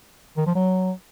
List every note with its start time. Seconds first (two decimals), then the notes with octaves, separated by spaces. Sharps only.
0.37 D#3
0.47 F3
0.55 F#3